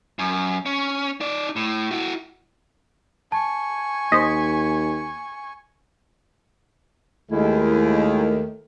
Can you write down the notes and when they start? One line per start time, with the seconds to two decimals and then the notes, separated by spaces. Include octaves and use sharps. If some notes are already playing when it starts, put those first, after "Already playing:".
0.19 F#2
0.66 C#4
1.21 D#4 D5
1.56 A2
1.91 E4 F#4
3.32 G#5 A5 C#6
4.12 D#2 C5 D#5 B6
7.31 D#2 D#3 G#3 A3 E4